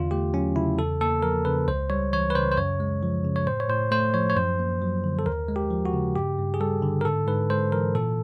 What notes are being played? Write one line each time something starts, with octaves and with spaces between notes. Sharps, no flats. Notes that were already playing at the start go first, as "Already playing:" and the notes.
Already playing: E2 D3 F4
A3 G4
F#3 C#4
C#3 E4
E2 A4
A#3 A4
F3 A#4
C#3 B4
C#2 C5
G3 C#5
E3 C#5
B4
C#3 C5
C5
F#2 C#5
G#3
F3
C#3
C#5
A2 C5
C#5
A2 C5
A3 C5
F3 C#5
C#5
F#2 C5
A#3
F#3
D3
A4
D#2 A#4
G#3
G4
F3
F#4
C#3
G2 G4
G2
G#4
G3 A4
D3
A#4
G#2 A4
G#2 B4
G#3 C5
E3 A#4
A#2 A4